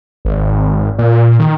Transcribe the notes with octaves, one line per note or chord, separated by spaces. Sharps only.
G#1
A#2
D#3